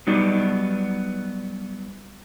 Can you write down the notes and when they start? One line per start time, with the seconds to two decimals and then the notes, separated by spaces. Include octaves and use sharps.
0.07 F#3 G3 B3 D#4 D5